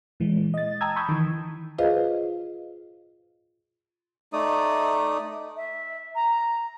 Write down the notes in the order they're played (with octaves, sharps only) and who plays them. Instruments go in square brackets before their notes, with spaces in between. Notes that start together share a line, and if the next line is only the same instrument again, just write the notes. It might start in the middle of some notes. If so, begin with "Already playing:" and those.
[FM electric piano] A#2 E3 G#3
D#5 A6
G5 A5 A#5 D#6 E6 G#6
B5 C#6 D#6 E6 G6
D#3 E3
[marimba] F4 G#4 B4 C5 D#5 F5
[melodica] A3 D#4 D5 D#6
[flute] E5
A#5